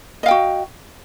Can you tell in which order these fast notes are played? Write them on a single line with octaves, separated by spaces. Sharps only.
D#5 F5 G5 F#4